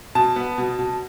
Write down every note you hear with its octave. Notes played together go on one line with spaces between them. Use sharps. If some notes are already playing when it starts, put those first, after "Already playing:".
B2 A5
B3
B2
B2